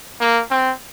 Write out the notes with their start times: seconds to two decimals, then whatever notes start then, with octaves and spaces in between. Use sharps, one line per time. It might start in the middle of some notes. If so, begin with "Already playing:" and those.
0.21 A#3
0.51 C4